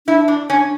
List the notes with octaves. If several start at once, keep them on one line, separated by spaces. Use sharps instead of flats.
D4 E4
D4
C#4 D4